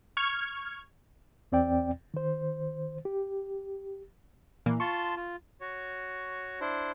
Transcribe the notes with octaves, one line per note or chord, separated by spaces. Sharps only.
C#6 F6 G#6
E2 C4 D5 G5
D#3 C5
G4
A#2 E3 A#3
F4 A5 C6 C#6
F4
F#4 C#5
D4 E4 C5